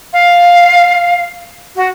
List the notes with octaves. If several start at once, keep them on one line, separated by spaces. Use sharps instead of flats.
F5
F#4